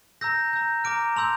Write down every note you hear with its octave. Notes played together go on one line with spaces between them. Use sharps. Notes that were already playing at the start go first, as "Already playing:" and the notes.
A#5 E6 G6 A#6
A#5 E6 G6
A#5 D6 F6 D7
A5 C6 E6 G6 F7